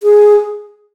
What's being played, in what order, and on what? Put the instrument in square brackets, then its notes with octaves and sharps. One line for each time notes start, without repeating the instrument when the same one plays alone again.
[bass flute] G#4